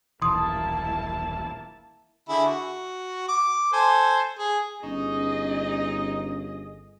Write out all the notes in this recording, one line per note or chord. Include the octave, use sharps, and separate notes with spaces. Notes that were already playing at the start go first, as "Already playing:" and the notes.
D#1 B1 E3 A#3 E4 A5 C6 D#6
D3 E4 G#4
F#4
D6
A4 C5 G#5
G#4
G1 C#4 D#4 G#4 D#5